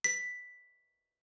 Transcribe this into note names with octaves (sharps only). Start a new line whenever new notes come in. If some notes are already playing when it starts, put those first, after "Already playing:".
B6